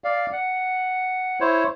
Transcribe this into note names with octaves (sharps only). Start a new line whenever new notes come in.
D5 F5
F#5
E4 C5 C#5